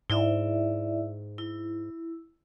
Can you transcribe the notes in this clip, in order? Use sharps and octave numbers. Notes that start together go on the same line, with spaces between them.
G#2 E4 D5 E5
E4